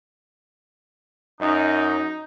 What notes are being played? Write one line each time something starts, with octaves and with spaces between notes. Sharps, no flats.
F#2 D#4